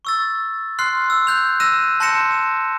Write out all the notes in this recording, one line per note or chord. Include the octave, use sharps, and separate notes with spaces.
C#6 E6 A6
C6 F6 F#6 C7
E6
F#6 G6 F7
E6 F#6 A#6 D#7 E7
A5 C6 G6 A#6 C#7 E7